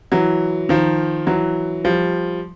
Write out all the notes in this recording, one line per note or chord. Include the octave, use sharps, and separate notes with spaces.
E3 F#3
D#3 F3
E3 F#3
F3 G3